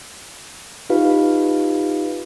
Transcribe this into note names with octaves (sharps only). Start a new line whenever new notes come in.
D#4 F4 G4 B4 F5